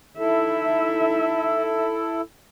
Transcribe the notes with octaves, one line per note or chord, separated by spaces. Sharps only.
D#4 E4 A4 E5